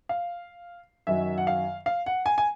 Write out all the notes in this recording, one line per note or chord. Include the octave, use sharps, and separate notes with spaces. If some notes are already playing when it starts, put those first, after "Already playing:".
F5
F#2 D#3 F#3 E5
F#5
F5
F5
F#5
G#5
G#5